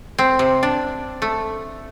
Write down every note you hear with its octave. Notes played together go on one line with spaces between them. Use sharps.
C4
C3
D4
A3